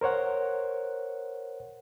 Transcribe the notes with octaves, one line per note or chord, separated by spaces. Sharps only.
A#4 C5 C#5 F#5